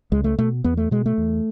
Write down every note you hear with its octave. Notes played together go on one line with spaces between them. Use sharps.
C#2 G#3
A3
B2 A3
E2 B3
A3
B2 G#3
A3
E2